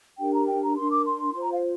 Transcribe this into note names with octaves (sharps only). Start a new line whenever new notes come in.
D4 G4 A#4 G5
A#5
G5
A#5
D4 A#4 C6
D6
C6
F4 C5 C6
A#5
F5